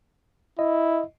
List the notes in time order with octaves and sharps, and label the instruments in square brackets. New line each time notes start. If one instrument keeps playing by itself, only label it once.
[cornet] E4 [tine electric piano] D#5